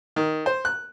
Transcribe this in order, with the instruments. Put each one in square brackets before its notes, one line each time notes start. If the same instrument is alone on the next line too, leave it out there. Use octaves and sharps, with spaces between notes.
[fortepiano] D#3
C5
F#6